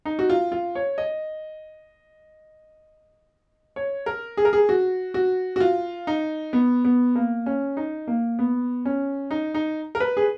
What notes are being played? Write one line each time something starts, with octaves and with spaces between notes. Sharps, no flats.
D#4
F#4
F4
F4
C#5
D#5
C#5
A#4
G#4
A#4
G#4
F#4
F#4
F#4
F4
D#4
B3
B3
A#3
C#4
D#4
A#3
B3
C#4
D#4
D#4
A#4
B4
G#4